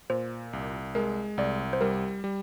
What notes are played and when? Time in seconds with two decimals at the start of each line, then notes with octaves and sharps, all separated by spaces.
0.10 A#2 C5
0.53 C2
0.95 G#3 A#4
1.38 C2 D5
1.73 C5
1.81 G3 A#4
2.24 G3